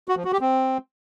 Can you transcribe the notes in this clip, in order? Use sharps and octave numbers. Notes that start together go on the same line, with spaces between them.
F#4
F3
F#4
G4
C4